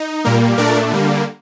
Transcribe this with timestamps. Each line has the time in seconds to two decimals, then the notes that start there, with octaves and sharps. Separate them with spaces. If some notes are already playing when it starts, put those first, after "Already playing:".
Already playing: D#4
0.25 A#2 G3 A#3 A#4
0.58 A#2 A3 D4 A#4 D5
0.91 D3 G3 A#3